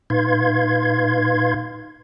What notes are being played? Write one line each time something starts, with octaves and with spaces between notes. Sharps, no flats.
A#2 D#4 B4 F5 C6 G#6